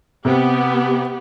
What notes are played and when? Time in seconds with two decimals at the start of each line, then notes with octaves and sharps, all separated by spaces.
0.25 C3 B3 G4